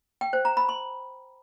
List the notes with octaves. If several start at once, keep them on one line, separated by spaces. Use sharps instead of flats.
G5
C5
A#5
B5
C6